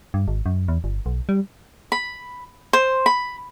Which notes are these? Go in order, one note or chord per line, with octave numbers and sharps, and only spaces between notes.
G2
G#1
F#2
E2
G1
B1
G3
B5
C5
B5